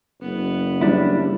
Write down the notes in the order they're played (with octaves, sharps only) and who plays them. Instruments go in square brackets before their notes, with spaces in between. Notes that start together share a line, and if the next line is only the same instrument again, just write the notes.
[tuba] F#1 [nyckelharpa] B3
[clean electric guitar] G3 D4 E4